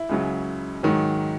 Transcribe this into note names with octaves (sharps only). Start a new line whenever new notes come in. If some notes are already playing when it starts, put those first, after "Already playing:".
Already playing: E4
C#2 C#3 F#3
G#2 D#3 F#3